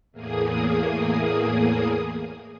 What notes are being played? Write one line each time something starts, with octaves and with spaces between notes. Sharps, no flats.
E2 A2 A#3 G#4 D#6